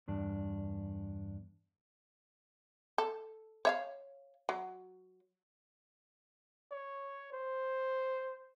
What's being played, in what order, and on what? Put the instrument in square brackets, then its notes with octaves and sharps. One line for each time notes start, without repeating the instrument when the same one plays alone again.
[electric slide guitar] E2 G2 D4
[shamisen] A4
C#5 E5 F5
F#3
[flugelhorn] C#5
C5